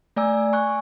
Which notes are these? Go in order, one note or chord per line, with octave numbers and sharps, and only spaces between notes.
A3 D5 G#5 E6
G#5 C#6 F#6